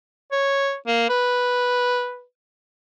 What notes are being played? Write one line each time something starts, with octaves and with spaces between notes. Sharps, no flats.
C#5
A#3
B4